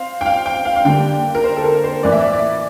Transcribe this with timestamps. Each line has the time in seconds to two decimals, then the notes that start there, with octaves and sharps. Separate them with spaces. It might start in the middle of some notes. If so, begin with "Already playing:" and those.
Already playing: C4 F5
0.21 G5
0.26 F5
0.46 G5
0.65 F5
0.76 F5
0.85 D3 G3 A#3 G5
1.35 A#4
1.44 C5
1.57 A4
1.64 A#4
1.84 C5
2.03 A2 E3 A#3 D5
2.12 E5
2.20 D5
2.33 D5